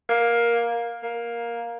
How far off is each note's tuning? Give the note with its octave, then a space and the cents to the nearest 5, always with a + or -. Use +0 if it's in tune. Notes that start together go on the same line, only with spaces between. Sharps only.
A#3 +10
A#3 +10